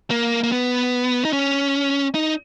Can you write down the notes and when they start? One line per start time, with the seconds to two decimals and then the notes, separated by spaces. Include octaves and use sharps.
0.11 A#3
0.43 A#3
0.52 B3
1.25 D#4
1.33 C#4
2.15 D#4